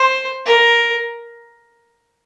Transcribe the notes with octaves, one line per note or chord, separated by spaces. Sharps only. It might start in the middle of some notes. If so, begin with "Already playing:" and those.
Already playing: C5
A#4